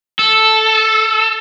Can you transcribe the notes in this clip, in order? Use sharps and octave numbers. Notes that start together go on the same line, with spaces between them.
A4